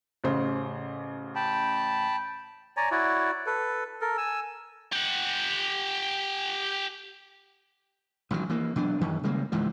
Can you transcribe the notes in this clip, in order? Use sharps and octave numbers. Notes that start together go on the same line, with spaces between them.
A1 C#3 C5
G5 A5 B5
C#5 D5 G#5 A#5
E4 F#4 C#5 D5
A4 B4
A4 A#4
G#5 E6
G4 F#5
A1 D#3 E3 F#3
E3 A#3
B2 F#3 D4
F#2 D#3 E3
C#3 G3 G#3 A#3
C#2 G#2 E3 F3